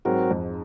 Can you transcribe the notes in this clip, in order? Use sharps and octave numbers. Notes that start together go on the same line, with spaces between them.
G#2 F#3 C4 F#4 A#4
F2